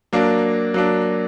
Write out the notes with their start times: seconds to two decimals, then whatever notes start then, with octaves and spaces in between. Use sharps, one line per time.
0.13 F#3 A#3 D4
0.74 F#3 A#3 D4